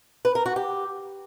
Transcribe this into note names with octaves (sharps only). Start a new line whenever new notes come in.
B4
A#4
F#4
G4